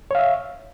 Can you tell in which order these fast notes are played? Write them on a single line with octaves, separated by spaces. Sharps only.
C#5 F5 E5